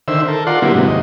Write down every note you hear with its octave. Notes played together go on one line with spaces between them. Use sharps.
D3 D#3 C5 E5 E6
A4 A#4
F4 D5 F#5 C6
D3 F#3 G3 A#3 B3 E4
G#2 C3 F#3
D#2 D#5